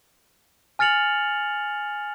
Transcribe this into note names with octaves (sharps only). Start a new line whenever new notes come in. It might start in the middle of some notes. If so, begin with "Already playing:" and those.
G#5 F6 A6 C#7 F7 F#7